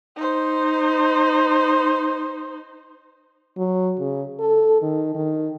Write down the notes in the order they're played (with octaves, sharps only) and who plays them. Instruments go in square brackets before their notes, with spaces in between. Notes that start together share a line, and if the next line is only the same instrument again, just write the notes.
[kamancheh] D#4 C5
[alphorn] F#3
C#3
A4
D#3
D#3